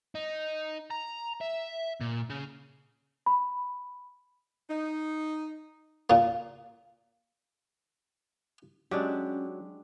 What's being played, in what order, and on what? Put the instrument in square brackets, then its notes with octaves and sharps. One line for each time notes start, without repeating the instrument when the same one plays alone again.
[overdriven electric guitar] D#4
A#5
E5
A#2
C#3
[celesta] B5
[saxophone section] D#4
[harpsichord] A#2 A#3
[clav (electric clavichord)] F#3 [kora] G#3 D4 G4 [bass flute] C#4